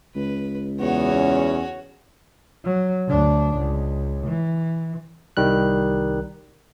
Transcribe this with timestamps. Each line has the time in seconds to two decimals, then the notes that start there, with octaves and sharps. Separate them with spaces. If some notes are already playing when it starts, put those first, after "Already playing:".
0.15 C#2 B4
0.80 E2 B3 F#4 C#5
1.15 C#4
2.65 F#3
3.07 D2 D4
3.57 C#2
4.27 E3
5.37 C2 D#3 G3 F#6